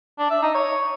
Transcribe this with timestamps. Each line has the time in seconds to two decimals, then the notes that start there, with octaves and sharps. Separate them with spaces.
0.19 D4
0.31 E5
0.43 D#4
0.55 C#5